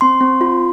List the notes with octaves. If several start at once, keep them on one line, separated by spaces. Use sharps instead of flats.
C4 C6
C4
F4